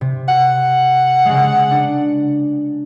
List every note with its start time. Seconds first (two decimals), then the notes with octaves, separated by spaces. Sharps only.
0.01 C3
0.28 F#5
1.25 C#3 G#3
1.71 D4